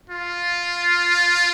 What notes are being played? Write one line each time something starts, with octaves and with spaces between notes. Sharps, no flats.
F4